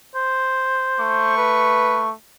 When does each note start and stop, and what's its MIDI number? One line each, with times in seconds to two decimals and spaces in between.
0.15 1.32 72
1.00 2.12 57
1.00 2.12 85
1.37 2.05 71